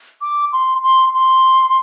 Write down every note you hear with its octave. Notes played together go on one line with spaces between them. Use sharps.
D6
C6
C6
C6